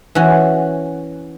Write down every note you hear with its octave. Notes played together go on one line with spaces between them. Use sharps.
E3 C#4 F#4